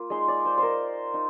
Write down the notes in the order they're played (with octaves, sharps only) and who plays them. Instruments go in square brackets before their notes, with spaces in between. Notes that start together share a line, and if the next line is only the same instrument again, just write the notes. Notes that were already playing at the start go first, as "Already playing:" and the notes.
Already playing: [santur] A#3 F4
G#3 D#4 C6
D5
C5
A#4 C5
D#4